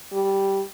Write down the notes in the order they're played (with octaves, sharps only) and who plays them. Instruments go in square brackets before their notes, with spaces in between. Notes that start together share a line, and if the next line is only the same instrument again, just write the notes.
[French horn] G3